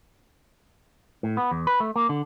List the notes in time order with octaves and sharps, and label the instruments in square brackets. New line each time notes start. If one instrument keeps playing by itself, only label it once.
[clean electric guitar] A2
B3
E2
B4
A3
A#3
D3